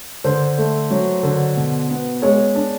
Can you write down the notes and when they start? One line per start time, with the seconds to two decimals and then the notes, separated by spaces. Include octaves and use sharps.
0.24 D3 C5
0.58 A3
0.91 F#3
1.23 D3
1.56 B2
1.90 B3
2.22 G#3 C#5
2.55 D4